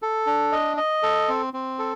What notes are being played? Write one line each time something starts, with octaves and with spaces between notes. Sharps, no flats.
A4
D4
D#5
D#5
A4
C4
C4
A4